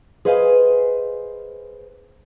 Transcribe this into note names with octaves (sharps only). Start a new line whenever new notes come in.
G#4 B4 C5 D#5 F5 G#5